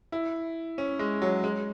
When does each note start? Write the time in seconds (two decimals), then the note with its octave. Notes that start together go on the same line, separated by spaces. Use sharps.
0.12 E4
0.78 C#4
0.99 G#3
1.22 F#3
1.44 G#3